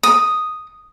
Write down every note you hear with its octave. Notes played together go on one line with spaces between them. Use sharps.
D#6